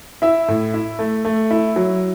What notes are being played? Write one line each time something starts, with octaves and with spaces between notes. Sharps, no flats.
E4 E5
A2
E4
A3
A3
E4
F#3